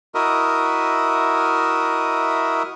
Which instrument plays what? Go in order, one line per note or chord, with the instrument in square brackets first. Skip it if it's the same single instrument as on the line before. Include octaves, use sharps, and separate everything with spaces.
[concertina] E4 F#4 A#4 D#5 E5